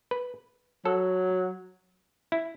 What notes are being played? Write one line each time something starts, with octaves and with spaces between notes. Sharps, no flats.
B4
F#3 A4
E4